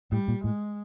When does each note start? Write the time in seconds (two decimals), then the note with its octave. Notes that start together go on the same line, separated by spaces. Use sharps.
0.12 A2 G3
0.28 A#2
0.44 A2 G#3